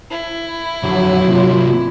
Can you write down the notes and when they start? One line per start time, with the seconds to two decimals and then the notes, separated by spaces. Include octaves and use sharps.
0.11 E4
0.83 F2 D3 F#3
1.28 C3 A#3 F4